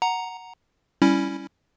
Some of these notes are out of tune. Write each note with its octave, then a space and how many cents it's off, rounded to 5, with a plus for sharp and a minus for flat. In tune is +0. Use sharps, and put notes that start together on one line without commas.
F#5 +0 A#5 +0
G3 +0 C#4 +0 E4 +0